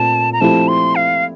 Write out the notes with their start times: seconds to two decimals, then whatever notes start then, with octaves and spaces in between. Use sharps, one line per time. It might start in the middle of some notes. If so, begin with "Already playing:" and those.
Already playing: A#2 A3 C4 F4 A5
0.33 A#5
0.41 F3 A3 C4 E4 G4 A5
0.68 C6
0.96 F5